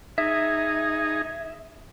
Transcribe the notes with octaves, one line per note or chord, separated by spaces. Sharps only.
D#4 G#4 E5